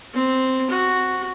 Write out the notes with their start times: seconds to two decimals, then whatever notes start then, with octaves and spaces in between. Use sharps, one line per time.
0.14 C4
0.70 F#4